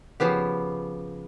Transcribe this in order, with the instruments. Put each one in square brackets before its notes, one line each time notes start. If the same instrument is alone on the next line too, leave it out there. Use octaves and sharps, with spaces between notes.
[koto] C#3 F3 B3 G4